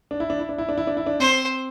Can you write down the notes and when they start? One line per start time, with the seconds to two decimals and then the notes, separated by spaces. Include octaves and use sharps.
0.11 D4
0.20 E4
0.30 D4
0.40 E4
0.49 D4
0.58 E4
0.69 D4
0.78 E4
0.87 D4
0.97 E4
1.06 D4
1.20 C4 C5